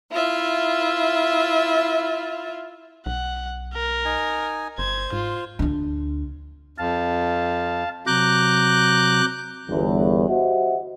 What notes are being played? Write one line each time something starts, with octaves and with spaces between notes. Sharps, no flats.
E4 F4 E5
B1 F#5
A#4
D#4 G#5
G1 C5 G#6
G#2 F4
D2 D4
F2 F5 A5
C3 F#3 A#5 D6 F#6 G6
G1 E2
F#4 G4 C5 D#5 E5 F#5